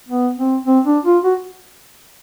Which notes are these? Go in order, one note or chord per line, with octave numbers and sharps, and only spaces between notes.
B3
C4
C4
D4
F4
F#4